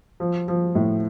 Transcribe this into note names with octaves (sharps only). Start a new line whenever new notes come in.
F3
F3
A2